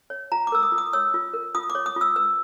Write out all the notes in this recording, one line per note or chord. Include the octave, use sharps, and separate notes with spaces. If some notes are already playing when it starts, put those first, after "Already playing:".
C#5
F4 A#5
D6
A#4 E6
D#6
F4
D#6
C#5 E6
F4
A#4
F4 D#6
D6
C#5
D#6
F4 E6
B4 E6